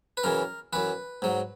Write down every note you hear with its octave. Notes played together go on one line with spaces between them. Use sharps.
B4
F#2 C#3 E3 A#4
F#2 E3 B4
G#2 F#3